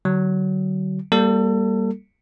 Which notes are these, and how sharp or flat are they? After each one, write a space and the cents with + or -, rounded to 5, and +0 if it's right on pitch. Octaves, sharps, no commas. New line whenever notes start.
D3 +0 F#3 +25
G3 +0 A#3 +0 A4 +30